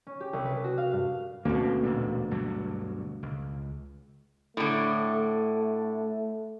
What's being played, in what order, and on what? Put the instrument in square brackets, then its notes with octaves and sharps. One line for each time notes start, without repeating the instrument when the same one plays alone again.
[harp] C#4
G4
C2
B4
F#4
F5
G2
[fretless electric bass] D2 B2 [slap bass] A#3 C4 C#4
[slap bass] E1 A#2 D3
G2 D3 F#3
C#2
[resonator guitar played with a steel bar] A2 D3 [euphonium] A3